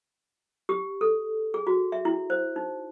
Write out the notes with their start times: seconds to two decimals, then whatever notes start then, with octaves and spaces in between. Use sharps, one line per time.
0.69 G4
1.01 A4
1.54 G#4
1.67 F#4
1.92 E5
2.05 E4
2.30 C5
2.56 D#4